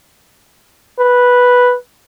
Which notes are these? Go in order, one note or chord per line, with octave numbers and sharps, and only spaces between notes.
B4